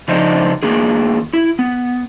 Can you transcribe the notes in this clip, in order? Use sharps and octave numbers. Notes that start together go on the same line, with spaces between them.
C#3 F3 D4 D#4 C5 D#5
D#3 A#3 D4 G#4
E4
B3